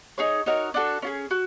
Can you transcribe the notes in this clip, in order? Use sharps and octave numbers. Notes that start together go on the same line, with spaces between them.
D#4 G#4 C#5
D#4 F#4 A#4 C#5
D4 F#4 A4
C#4 F4 G#4
F#4